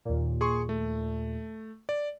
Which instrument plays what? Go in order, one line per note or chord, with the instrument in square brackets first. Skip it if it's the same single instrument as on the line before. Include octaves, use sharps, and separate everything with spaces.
[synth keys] D#2 A#2
[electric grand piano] G#4 C6 C#6
A3
D5